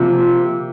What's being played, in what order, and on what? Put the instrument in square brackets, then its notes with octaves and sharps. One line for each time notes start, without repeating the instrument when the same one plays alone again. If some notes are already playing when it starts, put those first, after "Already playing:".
Already playing: [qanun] C3 F3 A#3